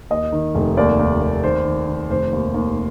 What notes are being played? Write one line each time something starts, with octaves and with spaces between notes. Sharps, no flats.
D#2 D#5
D#3
F1
D#2 D5
D#2
D#2
D#3 C5
D#3
D#3
F1 C5
D#2
D#2